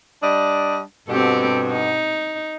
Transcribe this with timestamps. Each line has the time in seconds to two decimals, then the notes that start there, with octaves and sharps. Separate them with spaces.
0.22 G3 D4 D#5
1.08 G2 B2 C4 G4 A4
1.72 D#4